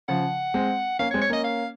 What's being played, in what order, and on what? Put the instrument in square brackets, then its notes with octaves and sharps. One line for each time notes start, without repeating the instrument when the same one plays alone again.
[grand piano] C#3 F3 [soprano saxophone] F#5
[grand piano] G#3 C4
[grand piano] A#3 C#4 [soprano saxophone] F5
[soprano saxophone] C#5
[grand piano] G#3 C4
[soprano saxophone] C#5
[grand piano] A#3 C#4 [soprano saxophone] D#5
[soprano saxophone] F5